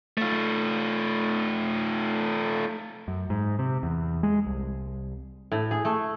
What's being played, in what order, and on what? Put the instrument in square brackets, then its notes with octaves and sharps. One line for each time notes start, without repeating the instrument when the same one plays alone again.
[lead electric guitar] A3 F4
[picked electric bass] F#2
G#2
C3
E2
G#3
C2
[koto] A2
G#4
A3